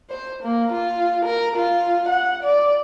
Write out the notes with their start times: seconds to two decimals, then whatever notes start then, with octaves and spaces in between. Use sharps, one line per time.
0.10 C5
0.43 A#3
0.72 F4
1.25 A#4
1.56 F4
2.08 F#5
2.43 D5